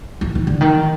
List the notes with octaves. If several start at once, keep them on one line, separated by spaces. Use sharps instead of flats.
E3
D#3
D3
D#3